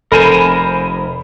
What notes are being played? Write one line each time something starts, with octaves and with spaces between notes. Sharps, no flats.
F1 A4 A#4 C5 G#5 B5 E7